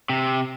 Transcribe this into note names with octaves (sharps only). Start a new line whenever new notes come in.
C3